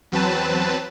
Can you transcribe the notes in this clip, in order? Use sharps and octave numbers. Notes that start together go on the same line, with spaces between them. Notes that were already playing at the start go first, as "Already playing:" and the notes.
E2 F#3 C4 B4 A5